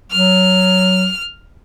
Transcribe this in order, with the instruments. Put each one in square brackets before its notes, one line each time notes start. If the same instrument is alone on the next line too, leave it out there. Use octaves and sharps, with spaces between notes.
[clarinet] F#3 [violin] F6